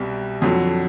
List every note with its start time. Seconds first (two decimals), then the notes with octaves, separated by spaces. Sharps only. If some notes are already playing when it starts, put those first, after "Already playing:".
Already playing: C2 B2 G3
0.42 F2 D3 F#3